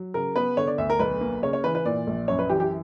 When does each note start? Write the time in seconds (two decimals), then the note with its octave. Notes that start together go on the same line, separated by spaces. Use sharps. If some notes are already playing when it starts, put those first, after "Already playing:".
Already playing: F#3
0.14 C#3 A#4
0.36 B3 B4
0.57 D3 C#5
0.67 D5
0.78 D2 E5
0.90 A#4
0.99 B1 B4
1.21 A#3
1.43 C#3 C#5
1.53 C#5
1.64 E3 B4
1.75 B4
1.85 A#2 D5
2.07 A#1
2.28 F#2 C#5
2.39 B4
2.49 E3 G4
2.60 G4